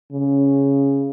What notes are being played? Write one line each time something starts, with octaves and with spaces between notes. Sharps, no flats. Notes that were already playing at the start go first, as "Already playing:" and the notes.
C#3